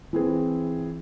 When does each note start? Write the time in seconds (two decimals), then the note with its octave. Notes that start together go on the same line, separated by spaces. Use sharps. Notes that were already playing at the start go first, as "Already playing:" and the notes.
0.13 E3 C4 G#4